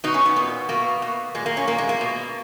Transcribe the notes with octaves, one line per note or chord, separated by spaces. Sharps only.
B2 D#4
C#4
B3
A#2
B2 A#3
B2
A#2 G#3
A#3
C#4
A#2 A#3
G#3
A#3
B2